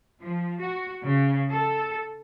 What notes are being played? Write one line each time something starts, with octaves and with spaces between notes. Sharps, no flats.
F3
F#4
C#3
A4